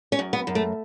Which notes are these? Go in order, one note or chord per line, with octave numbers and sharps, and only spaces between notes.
C#4
F#2
B3
F#2
A3